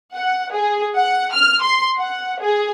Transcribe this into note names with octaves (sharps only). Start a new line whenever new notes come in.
F#5
G#4
F#5
F6
C6
F#5
G#4